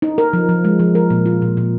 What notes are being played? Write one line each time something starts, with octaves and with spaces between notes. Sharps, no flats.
D#4
A#4
F3
F3
G#3
F3
A#4
A#2
F4
A#2
A#2